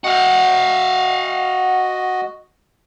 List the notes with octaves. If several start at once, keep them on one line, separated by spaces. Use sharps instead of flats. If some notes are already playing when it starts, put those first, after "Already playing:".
F#4 D#5 F5 F#5